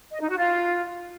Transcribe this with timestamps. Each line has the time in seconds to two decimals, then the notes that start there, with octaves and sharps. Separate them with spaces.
0.12 D#5
0.20 D#4
0.29 F#4
0.38 F4